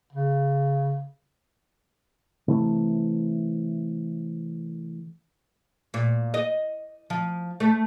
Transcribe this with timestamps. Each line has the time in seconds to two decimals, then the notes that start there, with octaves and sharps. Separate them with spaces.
0.13 C#3
2.48 C3 E3 A3
5.94 A#2
6.34 D#5
7.10 F3
7.60 A3